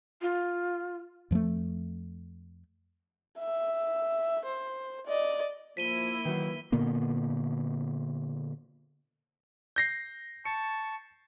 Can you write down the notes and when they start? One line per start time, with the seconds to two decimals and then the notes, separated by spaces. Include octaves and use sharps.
0.22 F4
1.31 F2 F3 F#3 A3
3.39 E5
4.45 C5
5.07 D5 D#5
5.77 F3 A#3 E4 B6 D#7 G7
6.25 D#3 E3 F#3
6.72 A#2 D3 A#3 B3
9.76 G6 A#6 C7
10.45 A5 C#6 C#7